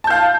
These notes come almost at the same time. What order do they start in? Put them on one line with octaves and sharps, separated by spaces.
A5 G6 F5